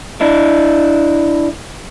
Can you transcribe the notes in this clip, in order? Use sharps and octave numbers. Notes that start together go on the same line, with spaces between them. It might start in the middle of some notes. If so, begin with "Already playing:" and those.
D4 E4